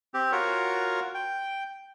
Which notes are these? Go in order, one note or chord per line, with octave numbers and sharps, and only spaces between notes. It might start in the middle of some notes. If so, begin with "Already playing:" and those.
C4 G4
F4 F#4 A#4 C#5
G5